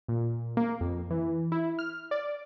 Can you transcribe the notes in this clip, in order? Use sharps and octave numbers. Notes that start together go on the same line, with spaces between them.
A#2
A#3
F2
E3
E4
F6
D5